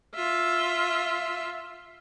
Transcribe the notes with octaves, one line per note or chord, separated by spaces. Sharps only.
F4 E5